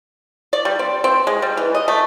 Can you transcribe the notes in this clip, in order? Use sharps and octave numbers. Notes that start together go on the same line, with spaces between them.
D5
G3
C4
C4
G#3
G3
E3
D#5
A3